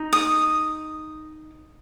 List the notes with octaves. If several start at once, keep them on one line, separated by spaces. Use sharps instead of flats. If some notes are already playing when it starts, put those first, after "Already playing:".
Already playing: D#4
D#6